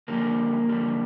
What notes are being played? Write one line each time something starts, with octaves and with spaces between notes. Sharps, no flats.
F2 D3 G3 A#3
F2 D3 G3